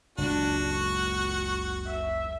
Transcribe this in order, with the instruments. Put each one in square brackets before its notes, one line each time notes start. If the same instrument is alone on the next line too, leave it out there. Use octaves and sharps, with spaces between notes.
[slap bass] F#1 C#2 G#3 [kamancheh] D4 [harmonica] F#4
[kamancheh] C#6
E5